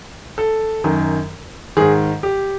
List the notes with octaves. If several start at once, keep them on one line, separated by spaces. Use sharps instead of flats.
A4
F#2 D#3
G#2 D#3 G#4
G4